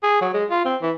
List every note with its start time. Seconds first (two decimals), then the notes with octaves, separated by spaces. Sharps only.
0.03 G#4
0.21 F#3
0.34 G#3
0.51 F4
0.65 C4
0.82 E3